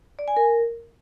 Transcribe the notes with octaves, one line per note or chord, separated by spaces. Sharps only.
D5
G#5
A#4